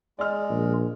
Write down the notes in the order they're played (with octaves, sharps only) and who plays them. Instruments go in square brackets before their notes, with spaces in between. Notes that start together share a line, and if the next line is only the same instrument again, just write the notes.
[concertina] G#3 [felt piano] D5 D#5 F6
[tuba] A#1